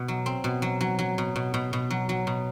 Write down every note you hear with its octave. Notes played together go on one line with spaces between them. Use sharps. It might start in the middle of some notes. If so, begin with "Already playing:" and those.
Already playing: B2
F#3
C4
B2
F#3
F#3
F#3
B2
B2
B2
B2
F#3
F#3
B2